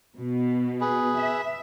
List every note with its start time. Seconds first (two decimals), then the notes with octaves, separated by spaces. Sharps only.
0.18 B2
0.81 G#4 B4
1.19 E5